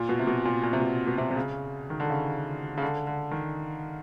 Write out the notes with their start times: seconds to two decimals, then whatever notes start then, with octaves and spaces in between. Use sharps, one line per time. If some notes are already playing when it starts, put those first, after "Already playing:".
Already playing: A#2
0.09 B2
0.19 C3
0.27 B2
0.45 A#2
0.63 A#2
0.73 C3
0.81 B2
1.07 B2
1.18 C3
1.31 C3
1.36 C#3
1.90 D#3
2.00 D3
2.10 C#3
2.78 C#3
2.82 D3
3.07 D3
3.31 D#3